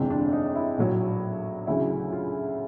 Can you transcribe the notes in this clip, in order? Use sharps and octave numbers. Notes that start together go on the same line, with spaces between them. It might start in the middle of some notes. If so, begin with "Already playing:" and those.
Already playing: G1 F2 C3 E3 G#3
D4
D#4
E4
A#1 A2 F#3
D2 C#3 F#3 E4
F4